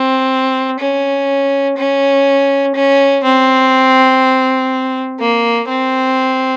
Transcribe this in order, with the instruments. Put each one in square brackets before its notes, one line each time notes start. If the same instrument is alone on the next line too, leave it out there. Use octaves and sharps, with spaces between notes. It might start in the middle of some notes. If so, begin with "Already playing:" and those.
Already playing: [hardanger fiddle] C4
C#4
C#4
C#4
C4
A#3
C4